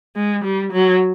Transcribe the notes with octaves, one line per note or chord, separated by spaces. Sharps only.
G#3
G3
F#3